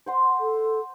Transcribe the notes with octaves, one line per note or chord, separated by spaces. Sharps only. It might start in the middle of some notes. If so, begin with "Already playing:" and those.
C5 F#5 C6
A4